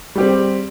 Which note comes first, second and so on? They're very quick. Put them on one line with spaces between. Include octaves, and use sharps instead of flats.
G3 G4 C4